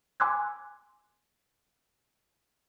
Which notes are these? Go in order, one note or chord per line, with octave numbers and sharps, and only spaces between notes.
G#5 C6 D6 E6 F#6 G#6